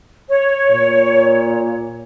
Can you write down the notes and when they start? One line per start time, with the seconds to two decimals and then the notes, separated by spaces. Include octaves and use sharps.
0.29 C#5
0.70 A#2